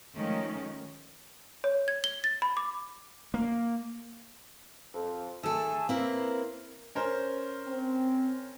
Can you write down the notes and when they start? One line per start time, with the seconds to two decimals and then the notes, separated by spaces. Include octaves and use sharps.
0.15 D#3 F3 G#3 A3 C#4
1.64 C#5
1.88 G#6
2.04 G7
2.24 A6
2.42 B5
2.57 D6
3.34 A#3
4.94 F2
5.43 D#3 A3 G#4 A4 E6
5.89 A#3 C4 E4 B4
6.95 C#4 A#4 C5
7.66 C4